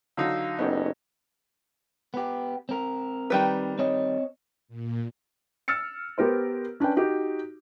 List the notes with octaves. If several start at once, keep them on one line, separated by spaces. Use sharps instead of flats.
D3 F#3 D#4 F5 E6
F#1 B3 C#4 D#4 G4 A4 D#5
B3 G4
C4 A#4
D#3 G3 B4
C4 C#5 D#5
A#2
E6 F6 A6 C#7
B3 G4 A#4 C5
C#4 D4 B4 G5
D#4 F#4 G4